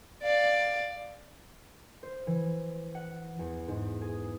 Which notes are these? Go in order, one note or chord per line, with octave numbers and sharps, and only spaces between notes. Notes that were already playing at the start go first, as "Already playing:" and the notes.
D5 F5
C5
E3
F#5
E2
G#2
G#4